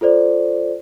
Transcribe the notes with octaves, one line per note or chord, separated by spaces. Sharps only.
F4 A4 C5 D5